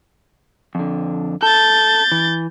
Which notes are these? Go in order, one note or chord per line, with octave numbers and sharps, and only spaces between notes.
F2 D3
A4 G6 A6
E3